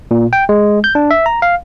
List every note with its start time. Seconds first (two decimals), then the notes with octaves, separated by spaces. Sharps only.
0.11 A#2
0.33 G5
0.49 G#3
0.84 G6
0.95 D4
1.11 E5
1.26 A#5
1.42 F5